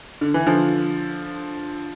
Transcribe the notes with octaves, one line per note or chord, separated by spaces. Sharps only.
D3
E3
D3 F3